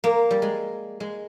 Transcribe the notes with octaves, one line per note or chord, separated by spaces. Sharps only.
A#3
G3
G#3
G#3